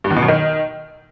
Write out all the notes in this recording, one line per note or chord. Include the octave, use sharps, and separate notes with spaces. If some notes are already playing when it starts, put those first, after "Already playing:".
G2
E2
B2
F#2
D#3